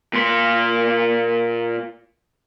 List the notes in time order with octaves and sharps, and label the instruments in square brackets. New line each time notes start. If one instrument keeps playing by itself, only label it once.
[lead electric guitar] A#2 C6